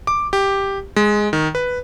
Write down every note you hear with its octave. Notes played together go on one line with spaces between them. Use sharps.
D6
G4
G#3
D#3
B4